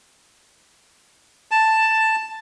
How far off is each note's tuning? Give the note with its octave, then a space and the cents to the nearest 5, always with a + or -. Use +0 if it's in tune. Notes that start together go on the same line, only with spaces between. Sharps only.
A5 +5